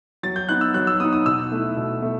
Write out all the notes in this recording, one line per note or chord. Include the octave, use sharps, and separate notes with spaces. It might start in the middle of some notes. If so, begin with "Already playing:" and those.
F#3 A6
G6
B3 D#4 F#6
E6
F#3 F#6
E6
B3 D#4 D#6
D#6
B2 E6
A3 E4
B2
A3